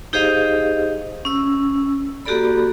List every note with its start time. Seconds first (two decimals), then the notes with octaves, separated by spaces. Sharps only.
0.13 D#4 G4 G#4 C5 D#5 F5
1.25 C#4 E6
2.25 A#3 F#4 G4 A4 D5 B5